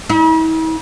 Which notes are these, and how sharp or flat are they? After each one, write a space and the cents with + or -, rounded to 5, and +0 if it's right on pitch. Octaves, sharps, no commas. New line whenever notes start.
E4 -45